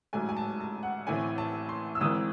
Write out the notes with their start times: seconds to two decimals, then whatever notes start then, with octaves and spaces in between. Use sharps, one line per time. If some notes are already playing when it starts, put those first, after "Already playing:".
0.13 A1 G#2 F#3 A3 G#5
0.29 G#5
0.37 A5
0.60 A5
0.83 F#5
1.07 A1 A2 E3 A3 C4 G#5
1.38 A5
1.69 C6
1.95 E6
2.00 G#1 G#2 E3 C4 D#6